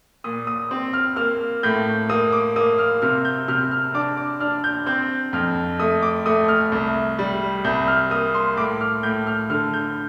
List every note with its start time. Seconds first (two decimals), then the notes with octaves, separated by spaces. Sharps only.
0.24 A#2 D#6
0.47 D#6
0.71 C4
0.93 F6
1.16 A#3 F6
1.63 A2 G6
2.09 A#3 D#6
2.32 D6
2.56 A#3 D#6
2.78 F6
3.02 C3 F6
3.25 G6
3.48 C3 F6
3.71 F6
3.94 D4 D6
4.17 D6
4.40 D4 F6
4.64 G6
4.86 C4 G6
5.33 F2 F6
5.80 A3 D#6
6.02 D6
6.26 A3 D#6
6.48 F6
6.72 C2
7.19 G3
7.64 C2 G6
7.87 F6
8.11 A#3 D#6
8.34 C6
8.57 A2 D6
8.81 F6
9.03 A2 G6
9.27 F6
9.50 D3 F6
9.74 G6